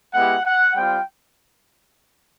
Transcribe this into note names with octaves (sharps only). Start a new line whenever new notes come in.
G#3 B3 E4 G4 F#5
F#5
G3 C4 F4 G5